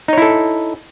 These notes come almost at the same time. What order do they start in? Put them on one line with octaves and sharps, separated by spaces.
D#4 C#5 E4 A4